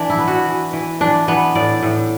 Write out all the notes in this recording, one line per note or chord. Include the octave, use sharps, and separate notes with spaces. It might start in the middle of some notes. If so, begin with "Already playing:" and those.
Already playing: E3 D4
E4
B3
F#4
E3
E3
E3 D4
E3 B3
A2 D5
A2